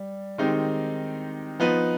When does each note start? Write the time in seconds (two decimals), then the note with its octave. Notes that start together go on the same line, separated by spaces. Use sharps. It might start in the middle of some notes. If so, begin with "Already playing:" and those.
Already playing: G3
0.38 D#3 G#3 C4 D#4 G4
1.60 F3 B3 D#4 B4